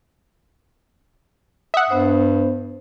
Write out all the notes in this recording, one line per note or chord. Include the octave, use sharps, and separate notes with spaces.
E5 F#5 D#6
G2 B3 C5